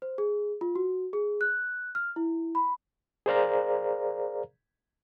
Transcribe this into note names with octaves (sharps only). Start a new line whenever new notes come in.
C5
G#4
F4
F#4
G#4
F#6
F6
E4
B5
G#4 A#4 C5 D5 F5 A#5